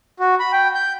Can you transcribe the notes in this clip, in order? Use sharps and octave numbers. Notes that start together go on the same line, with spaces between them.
F#4
B5
G5
G6